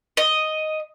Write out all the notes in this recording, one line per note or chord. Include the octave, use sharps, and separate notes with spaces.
D#5